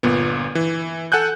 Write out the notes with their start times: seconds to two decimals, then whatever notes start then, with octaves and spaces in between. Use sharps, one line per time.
0.03 G1 A#2 B3
0.55 E3
1.12 A4 F#5 G#5 F#6 G6